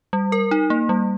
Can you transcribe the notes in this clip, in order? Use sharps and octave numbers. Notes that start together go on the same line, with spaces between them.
G3
A#4
D#4
A#3
G3